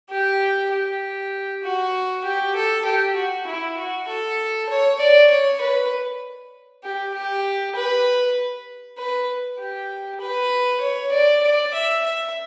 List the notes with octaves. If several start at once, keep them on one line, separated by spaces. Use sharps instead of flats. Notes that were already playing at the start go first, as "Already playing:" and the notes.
G4
G4
F#4
G4
A4
G4
F#4
E4
F#4
A4
C#5
D5
C#5
B4
G4
G4
B4
B4
G4
B4
C#5
D5
D5
E5
E5